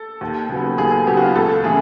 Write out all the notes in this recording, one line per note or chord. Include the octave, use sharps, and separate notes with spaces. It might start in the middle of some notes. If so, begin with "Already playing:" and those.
Already playing: A4
D#2
C#3 F#3 B3
D#2 G#4
G#4
C#3 F#3 B3 G4
F#4
F4
C#2 A4
C#3 E3 A3 G#4